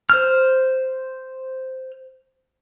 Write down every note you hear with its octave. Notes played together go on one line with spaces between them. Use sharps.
C5 F6